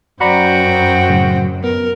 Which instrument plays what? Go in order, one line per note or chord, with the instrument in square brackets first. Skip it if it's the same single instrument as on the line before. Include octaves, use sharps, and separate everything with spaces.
[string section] F#2 [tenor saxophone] F#4 [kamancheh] C5 G5 [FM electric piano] D5 A#5 B5
[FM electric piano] A2 C#3 F#3
[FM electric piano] B3 [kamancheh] A#4